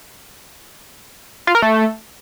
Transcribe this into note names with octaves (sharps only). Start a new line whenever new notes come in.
F4
A#4
A3